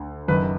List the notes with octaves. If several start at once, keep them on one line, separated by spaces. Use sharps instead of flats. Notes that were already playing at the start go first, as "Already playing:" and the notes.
Already playing: D2 D3
F#1 F#2 D#3 B4